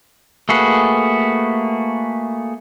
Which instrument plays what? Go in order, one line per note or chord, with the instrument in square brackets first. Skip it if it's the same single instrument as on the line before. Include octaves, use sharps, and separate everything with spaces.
[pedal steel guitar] A3 A#3 F#4 G#4 B4